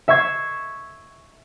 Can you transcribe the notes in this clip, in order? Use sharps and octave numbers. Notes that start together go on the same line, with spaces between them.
E5 C#6 E6 G#6 C7